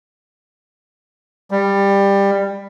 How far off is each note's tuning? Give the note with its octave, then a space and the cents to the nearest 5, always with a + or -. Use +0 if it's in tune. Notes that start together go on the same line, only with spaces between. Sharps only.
G3 +15